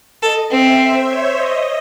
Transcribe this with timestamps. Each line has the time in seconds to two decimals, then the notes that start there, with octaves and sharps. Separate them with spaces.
0.22 A4 D#5
0.51 C4 E5
0.79 C5
1.08 C#5
1.36 D#5